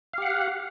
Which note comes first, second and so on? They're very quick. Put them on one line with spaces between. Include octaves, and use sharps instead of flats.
F5 G4 F#5